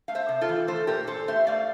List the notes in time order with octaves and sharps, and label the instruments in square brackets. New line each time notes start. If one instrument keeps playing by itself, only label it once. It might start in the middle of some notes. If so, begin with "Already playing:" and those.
[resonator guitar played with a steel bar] A3 F5
C5 E5
C3
F4 A4
E3
A3 A4 C5
A#2 G4 A#4
A#2 A4 C5
A3 C5 E5
A3 D5 F5